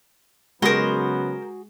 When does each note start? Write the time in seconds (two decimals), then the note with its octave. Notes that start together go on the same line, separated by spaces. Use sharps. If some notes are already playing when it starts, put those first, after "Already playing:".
0.62 C#3 F#3 G#3 B3 F#4 G#4 A#4 C5